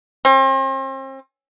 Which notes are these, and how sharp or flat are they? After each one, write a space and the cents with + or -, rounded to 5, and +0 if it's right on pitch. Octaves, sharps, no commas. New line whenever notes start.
C4 +40